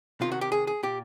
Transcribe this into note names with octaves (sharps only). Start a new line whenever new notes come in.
C3 D#3 F4
F#4
G4
G#4
G#4
A#2 G4